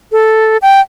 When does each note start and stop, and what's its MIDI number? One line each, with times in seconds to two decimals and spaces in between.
0.12 0.57 69
0.62 0.80 79